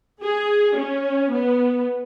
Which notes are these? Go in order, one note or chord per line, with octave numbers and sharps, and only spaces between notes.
G#4
C#4
B3